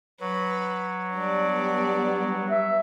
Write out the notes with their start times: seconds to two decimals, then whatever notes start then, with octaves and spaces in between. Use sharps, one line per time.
0.20 F#3 B4
1.15 G3 B3 D4 D5
2.50 E5